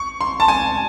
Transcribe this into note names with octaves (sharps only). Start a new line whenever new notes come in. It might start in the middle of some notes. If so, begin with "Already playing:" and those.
Already playing: C#6
C6
A5
G#5